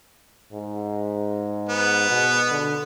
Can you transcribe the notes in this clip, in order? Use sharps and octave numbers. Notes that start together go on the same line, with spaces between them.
G#2
B3
B2
D3